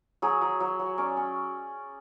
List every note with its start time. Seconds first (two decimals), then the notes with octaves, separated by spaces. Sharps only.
0.22 F#3 G#4
0.41 F#3
0.60 F#3
0.79 F#3
0.98 C#4 D5
1.17 C#4